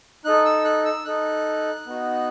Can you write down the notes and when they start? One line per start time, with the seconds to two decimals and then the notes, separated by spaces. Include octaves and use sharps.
0.25 D#4 A4 F#6
0.45 E6
0.65 F#6
0.85 E6
1.05 D#4 A4 F#6
1.86 B3 D#4 F#4